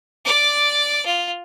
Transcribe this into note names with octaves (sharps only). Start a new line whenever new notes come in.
D5 D6
F4